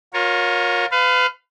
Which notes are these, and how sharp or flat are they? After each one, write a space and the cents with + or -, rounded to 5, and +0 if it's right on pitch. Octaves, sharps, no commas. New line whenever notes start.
F4 +40 A#4 +10 C#5 +0
B4 +30 F5 +0